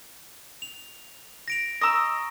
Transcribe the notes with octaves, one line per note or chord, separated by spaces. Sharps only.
F7
A#6 D7 F7
D#5 A#5 C#6 E6 A#6